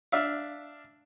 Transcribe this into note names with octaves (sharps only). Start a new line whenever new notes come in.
D4 E5 F5